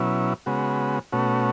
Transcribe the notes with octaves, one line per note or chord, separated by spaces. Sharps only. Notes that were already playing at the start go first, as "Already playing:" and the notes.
Already playing: B2 F#3 C#4 E4
C#3 G#3 B3 F#4
B2 A3 C#4 F#4